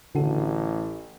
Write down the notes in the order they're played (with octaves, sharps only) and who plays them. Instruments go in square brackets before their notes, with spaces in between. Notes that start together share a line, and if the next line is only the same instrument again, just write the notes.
[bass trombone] A1 [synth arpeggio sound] D3 F#4 A4